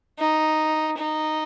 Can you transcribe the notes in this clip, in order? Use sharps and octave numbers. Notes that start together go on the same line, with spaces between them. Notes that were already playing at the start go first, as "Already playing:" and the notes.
D#4
D#4